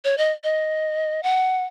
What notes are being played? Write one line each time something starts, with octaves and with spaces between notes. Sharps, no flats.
C#5
D#5
D#5
F#5